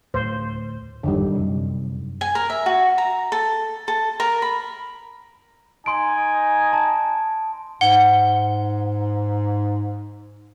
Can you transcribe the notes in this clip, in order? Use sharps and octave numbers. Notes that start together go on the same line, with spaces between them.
D1 D2 A2 C5
G#1 F2 D3 D#3 G3
F#2 C3
G#5
A#4
E5
F#4
A#5
A4
A4
A#4
B5
D#4 G#5 C6 D7
A5
G#2 F#5 G7